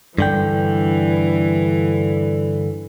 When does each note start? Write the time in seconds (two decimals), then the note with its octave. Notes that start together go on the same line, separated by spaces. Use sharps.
0.18 G2 D3 E3 G5